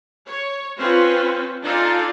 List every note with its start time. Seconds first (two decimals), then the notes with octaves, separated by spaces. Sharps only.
0.26 C#5
0.78 C4 C#4 F4 B4 C5
1.63 D4 D#4 F4 A4 D5 G#5